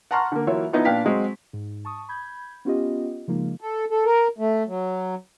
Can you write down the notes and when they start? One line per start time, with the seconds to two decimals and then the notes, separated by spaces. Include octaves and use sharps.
0.11 F#5 A5 A#5 C6 C#6 F6
0.32 D3 A#3
0.47 E3 F#3 A#3 F4 C#5 E5
0.73 F3 B3 D#4 E4
0.85 A#2 D4 B4 F5 G5 B6
1.04 F#3 G#3 C4
1.53 G#2
1.85 A5 C#6 D#6
2.09 B5 G6 G#6
2.65 B3 C#4 F4 G4 D#5
3.28 C#3 F3 G#3 A#3 D#4
3.61 A4
3.90 A4
4.05 A#4
4.38 A3
4.67 F#3